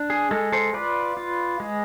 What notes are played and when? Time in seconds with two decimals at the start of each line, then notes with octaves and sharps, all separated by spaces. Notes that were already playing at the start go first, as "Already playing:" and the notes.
Already playing: D4
0.10 G#4
0.31 G#3 A4
0.53 A4 C5
0.74 F4 B4 D5
1.17 F4
1.60 G#3